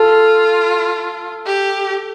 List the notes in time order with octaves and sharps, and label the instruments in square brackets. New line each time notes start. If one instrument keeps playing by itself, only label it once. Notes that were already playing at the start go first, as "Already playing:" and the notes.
Already playing: [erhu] F4 [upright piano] A4
[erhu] G4